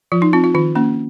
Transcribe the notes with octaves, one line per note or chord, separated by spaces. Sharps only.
F3 F4
D#4
C4 F4
F4
D#3 F4
A#3 C#4